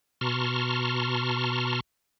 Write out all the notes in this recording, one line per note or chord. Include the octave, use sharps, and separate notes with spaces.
B2 A5 A#5 C6 C#6 F6